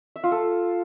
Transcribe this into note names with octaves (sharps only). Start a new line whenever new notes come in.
E5
F4
A4